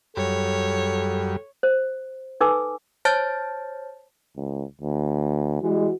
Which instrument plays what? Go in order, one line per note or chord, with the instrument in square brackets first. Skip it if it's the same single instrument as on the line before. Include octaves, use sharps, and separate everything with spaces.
[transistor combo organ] F#2 G3 [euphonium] A4 [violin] C#5
[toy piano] C5
D#4 A4 B4 G#5 D6 E6
[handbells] C5 C#5 A5 F6 G6 A6
[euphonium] C#2
D2
[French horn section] E3 G3 G#3 [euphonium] F#4